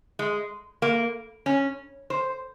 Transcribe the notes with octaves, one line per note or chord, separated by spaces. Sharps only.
G#3
A#3
C#4
C5